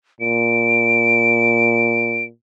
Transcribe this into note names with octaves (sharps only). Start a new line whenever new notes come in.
A#2 D7